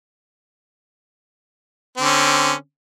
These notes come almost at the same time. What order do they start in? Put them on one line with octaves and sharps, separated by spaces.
C4 D3 C#4